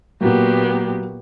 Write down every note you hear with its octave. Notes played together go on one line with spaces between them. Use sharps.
A#2 F#3 A#3 B3 F#4 G4